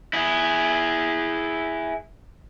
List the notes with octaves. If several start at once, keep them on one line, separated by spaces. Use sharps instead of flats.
E4 G#4